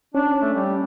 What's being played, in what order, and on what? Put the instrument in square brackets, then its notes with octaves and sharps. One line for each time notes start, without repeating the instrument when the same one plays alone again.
[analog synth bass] C#4 [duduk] D4
[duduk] A3
G3